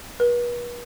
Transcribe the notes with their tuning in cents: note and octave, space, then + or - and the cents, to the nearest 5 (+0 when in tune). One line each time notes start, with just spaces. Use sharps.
B4 -40